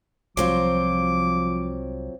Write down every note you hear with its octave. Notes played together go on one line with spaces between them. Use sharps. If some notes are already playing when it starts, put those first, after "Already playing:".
C2 F3 F#3 C4 F4 D6